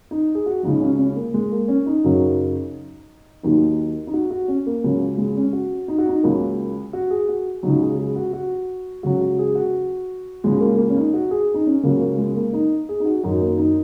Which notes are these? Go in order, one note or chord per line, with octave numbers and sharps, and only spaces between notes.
D#4
G#4
F#4
C#2 C#3 F#3 D#4
C#4
C#4
A#3
G#3
A#3
C#4
D#4
F#2 C#3 F#3
D#2 D#3 F#3 D#4
D#4
F#4
F#4
C#4
A#3
C#2 C#3 F#3 C#4
G#3
C#4
F#4
D#4
F#4
D#4
C#2 C#3 F#3 A#3
F#4
G#4
F#4
C#2 C#3 F#3 D#4
G#4
G#4
F#4
F#4
C#2 C#3 F#3 F#4
F#4
G#4
F#4
C#2 C#3 F#3 G#3
A#3
A#3
C#4
D#4
F#4
G#4
D#4
C#4
C#2 C#3 F#3 A#3
A#3
G#3
A#3
D#4
G#4
D#4
F#4
F#2 D#3 F#3 D#4
A#3
D#4